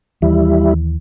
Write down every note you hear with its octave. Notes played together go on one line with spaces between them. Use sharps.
D#2 E3 G3 E4